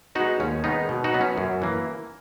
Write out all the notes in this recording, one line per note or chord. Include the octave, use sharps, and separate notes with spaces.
G#3 B3 D#4 F#4
D#2 C#4
D#3 G#3 B3 D#4
B2
D#4 F#4
F#3 B3
C#4
F#2
E3 A#3